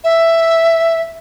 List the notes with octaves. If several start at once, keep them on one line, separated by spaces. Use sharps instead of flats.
E5